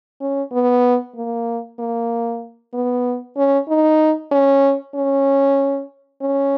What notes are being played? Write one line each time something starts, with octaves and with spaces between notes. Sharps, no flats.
C#4
B3
A#3
A#3
B3
C#4
D#4
C#4
C#4
C#4